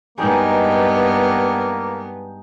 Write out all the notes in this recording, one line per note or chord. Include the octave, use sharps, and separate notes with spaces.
G2 G#3 A#3 B3 D#4 G5